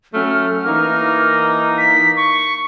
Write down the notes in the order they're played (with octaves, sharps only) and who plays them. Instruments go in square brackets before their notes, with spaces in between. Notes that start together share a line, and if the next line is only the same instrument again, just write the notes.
[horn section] F#3 A3 C#4 [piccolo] F6
[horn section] E3 A#3 D#4
[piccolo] B6
C#6